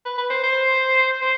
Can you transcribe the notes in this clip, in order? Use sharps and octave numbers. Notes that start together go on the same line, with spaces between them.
B4
B4
C5
C5
C5